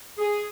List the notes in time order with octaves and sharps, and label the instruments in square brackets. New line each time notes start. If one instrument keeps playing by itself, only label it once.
[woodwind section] G#4